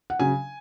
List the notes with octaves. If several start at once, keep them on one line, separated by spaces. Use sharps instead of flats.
F#5
C#3 F#3 G#5